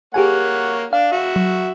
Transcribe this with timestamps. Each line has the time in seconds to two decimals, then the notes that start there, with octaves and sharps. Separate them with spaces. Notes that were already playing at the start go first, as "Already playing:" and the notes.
0.14 A#3 G4 G#4 C#5 F#5 G#5
0.93 D4 F5
1.12 F#4 E5
1.36 F#3